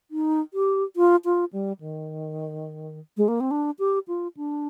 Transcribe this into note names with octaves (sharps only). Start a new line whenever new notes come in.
D#4
G4
F4
F4
G3
D#3
G#3
A#3
C4
D4
G4
F4
D4